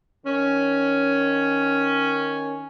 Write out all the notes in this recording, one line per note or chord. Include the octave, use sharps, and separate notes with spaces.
D#3 C#4